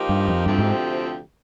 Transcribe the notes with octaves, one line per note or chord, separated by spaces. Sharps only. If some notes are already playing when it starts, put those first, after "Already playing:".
Already playing: F3 A#3 D#4 G4
G2
F2
D2 G2 C3 F3 C4 G4
G#2